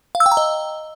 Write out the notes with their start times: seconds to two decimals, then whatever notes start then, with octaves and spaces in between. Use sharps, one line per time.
0.15 F5
0.20 E6
0.26 G5
0.32 A#5
0.37 D#5